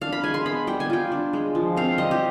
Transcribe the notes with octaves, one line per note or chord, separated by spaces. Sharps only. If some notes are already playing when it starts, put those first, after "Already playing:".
D4 F5
B5
G#3 G#5
C6
B3 B5
G3 G5
G#5
F4 G5
D4
G#3
F3
C4 F5
G3 D#5
G4